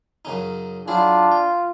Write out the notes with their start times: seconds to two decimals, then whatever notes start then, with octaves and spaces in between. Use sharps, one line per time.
0.25 F#2 C#3 D#4
0.88 F#3 D4 E4 F4 G#4
1.32 G5